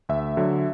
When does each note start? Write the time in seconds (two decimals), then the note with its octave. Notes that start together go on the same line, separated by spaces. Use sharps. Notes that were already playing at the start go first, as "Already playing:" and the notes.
0.09 D2 E5
0.37 D3 F#3